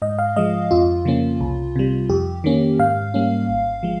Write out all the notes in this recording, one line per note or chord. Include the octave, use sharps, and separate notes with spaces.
G#2 D#5
F5
F3 G#3 D#5
F2 F4
C#3 F3 A#3 C#4
C2
C3 G3
F2 G4
D#3 A#3 C#4
G#2 F5
G3 A#3 C#4
G#1
F3 G#3